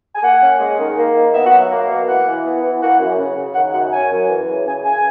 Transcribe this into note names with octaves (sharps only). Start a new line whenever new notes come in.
G#5
A#3 F#5
C#4
G#3
D#3
A#3
D#3
B3 E5
F#5
F#3
E5
A#3
B2
E3 F#5
E3
B3
E3
A#3 F#5
F#2
C#3
C#3
D#3 F#5
F#2 F#5
C#4 G#5
F#2
E3
C#3
C#3 G#5
C#3 G#5